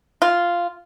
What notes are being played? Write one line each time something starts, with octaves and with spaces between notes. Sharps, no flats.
F4